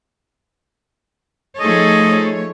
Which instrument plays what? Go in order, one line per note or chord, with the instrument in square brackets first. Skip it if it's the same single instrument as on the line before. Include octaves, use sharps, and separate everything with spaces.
[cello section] F3 A3 C#5 [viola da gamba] D#4 G#4 A4 [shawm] D#5